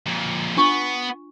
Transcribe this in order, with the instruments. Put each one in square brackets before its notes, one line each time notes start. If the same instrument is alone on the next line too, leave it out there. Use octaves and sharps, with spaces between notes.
[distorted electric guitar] F2 A#2
[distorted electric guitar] B3 [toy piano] D4 F4 C#6